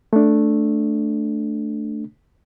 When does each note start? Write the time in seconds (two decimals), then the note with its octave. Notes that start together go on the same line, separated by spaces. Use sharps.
0.13 A3 D4